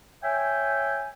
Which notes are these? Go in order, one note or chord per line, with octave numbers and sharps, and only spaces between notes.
C#5 E5 G5 G#5